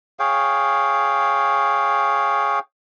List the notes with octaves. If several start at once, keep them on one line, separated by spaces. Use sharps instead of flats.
G#4 C#5 F5 G5